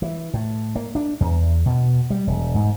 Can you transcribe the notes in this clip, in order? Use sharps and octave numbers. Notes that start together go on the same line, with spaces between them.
E3
A2
A#3
D4
E2
B2
G3
E1
G#2